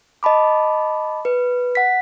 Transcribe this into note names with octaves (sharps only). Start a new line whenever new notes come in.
D#5 A5 B5 D6
B4
F#5 B6